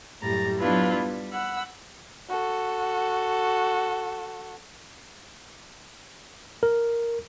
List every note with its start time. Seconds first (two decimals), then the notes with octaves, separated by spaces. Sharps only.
0.21 F#2 A2 G3 A#5 A6
0.59 F#3 B3 D4 E4 F4 B4
0.92 G3
1.31 F#5 B5 E6
2.29 F#4 A4
6.63 A#4